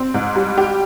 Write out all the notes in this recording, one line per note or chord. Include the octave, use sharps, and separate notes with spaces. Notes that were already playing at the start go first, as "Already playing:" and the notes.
Already playing: C4
G#2
G3
G4